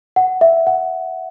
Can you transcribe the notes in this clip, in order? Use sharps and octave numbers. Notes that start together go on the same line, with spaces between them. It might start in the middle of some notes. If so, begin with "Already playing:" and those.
F#5
E5
F#5